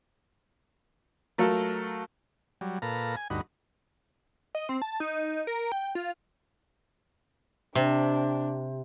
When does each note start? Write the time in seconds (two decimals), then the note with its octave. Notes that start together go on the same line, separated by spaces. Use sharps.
1.38 F#3 A3 F4 A4 A#4
2.61 F#3 G3
2.82 A#2 A4 B4 F5 A#5
3.16 G#5
3.30 D2 G2 D#4 F#4 B5
4.55 D#5
4.69 C4
4.82 A5
5.00 D#4
5.47 A#4
5.72 G5
5.95 F4
7.75 C3 D4